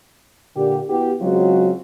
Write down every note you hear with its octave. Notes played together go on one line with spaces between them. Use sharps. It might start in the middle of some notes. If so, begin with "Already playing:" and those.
A#2 D3 G4
B3 E4 F#4 G4
C#3 F#3 G#3 C4 F4 F#4